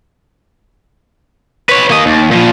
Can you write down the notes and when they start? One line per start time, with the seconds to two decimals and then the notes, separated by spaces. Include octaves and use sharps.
1.69 B4 C#5
1.90 A#3 D#5
2.06 D#2
2.31 A#2 F3